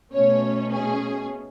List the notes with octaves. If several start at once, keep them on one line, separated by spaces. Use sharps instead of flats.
B2 A3 C#4 C#5
G#4